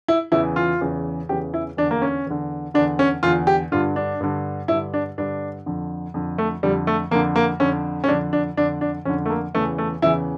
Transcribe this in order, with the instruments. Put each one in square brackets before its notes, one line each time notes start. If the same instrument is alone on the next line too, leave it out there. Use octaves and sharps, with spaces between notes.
[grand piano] E4
E2 C#3 E3 E4
F4
E2 C#3 E3
E2 C#3 E3 G4
E4
E2 D4
D3
A#3
C#4
E2 D3
D3 D4
E2
C#4
E2 D3 F4
G4
G2 D3 F4
D4
G2 D3
G2 D3 E4
D4
G2 D3 D4
F2 D3
F2 D3
A3
F2 D3 G3
A3
F2 A#3
D3
A#3
F2 D3 C#4
C#4
F2 D3 D4
D4
F2 D3 D4
D4
F2 D3 C#4
A3
A#3
E2 C#3 E3 A3
A3
E2 C#3 E3 E4